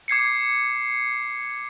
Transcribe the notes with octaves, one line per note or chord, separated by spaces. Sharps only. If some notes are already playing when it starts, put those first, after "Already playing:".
D6 G#6 C7 C#7